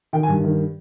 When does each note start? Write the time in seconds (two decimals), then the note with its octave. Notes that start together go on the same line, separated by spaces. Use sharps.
0.13 D#3 G5
0.23 G#5
0.28 G2
0.44 D#3